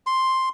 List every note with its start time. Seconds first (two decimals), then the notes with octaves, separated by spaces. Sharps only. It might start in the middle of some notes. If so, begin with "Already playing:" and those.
0.07 C6